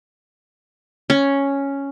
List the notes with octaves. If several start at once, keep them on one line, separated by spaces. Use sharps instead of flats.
C#4